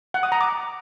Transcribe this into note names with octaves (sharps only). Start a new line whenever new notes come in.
F#5
D#6
A#5
D6